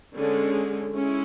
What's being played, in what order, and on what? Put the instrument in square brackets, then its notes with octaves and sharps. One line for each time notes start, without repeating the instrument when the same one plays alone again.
[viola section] D3 G#3 C#4
G#3 C#4 E4